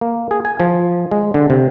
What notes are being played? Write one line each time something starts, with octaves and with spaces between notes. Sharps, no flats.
A#3
G#4
G#5
F3
G#3
D3
C3